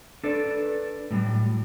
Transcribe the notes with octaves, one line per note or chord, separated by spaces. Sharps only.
D4 A4 B4 D5
A2 F#3 G3